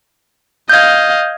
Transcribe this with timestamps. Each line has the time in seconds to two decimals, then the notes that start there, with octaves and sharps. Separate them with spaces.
0.70 D#5 F5 G6 G#6